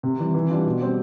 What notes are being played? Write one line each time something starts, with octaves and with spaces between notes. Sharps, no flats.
C3
E3 G3
E3
G3 D4 F4
B2
G3 C4